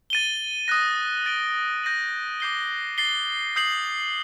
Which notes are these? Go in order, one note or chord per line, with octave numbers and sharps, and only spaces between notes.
A6 D#7 G7
D#6 F#6 A#6
A6 D7 G7
G6 A#6 D#7 F#7
D6 G6 C7 G7
A6 C7 G7
D#6 G6 C7 F#7